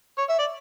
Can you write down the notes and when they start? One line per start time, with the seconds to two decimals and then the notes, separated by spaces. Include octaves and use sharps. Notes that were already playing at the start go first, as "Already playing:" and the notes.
0.18 C#5
0.29 E5
0.39 D5